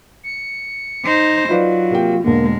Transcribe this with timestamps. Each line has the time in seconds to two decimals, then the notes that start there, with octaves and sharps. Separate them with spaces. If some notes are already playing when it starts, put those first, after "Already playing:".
0.23 C#7
1.05 D#4 C5
1.49 F#3 D#4 F4 B4 D5
1.91 C3 A#3 G5
2.24 E1 D3 G#3 A#3